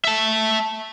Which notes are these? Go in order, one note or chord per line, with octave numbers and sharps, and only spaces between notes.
E5 A5